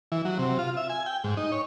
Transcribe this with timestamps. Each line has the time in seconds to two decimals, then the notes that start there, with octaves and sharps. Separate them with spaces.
0.12 E3
0.25 F#3
0.39 C3
0.59 F4
0.77 E5
0.89 G#5
1.06 G5
1.24 G#2
1.37 D#4
1.52 C#5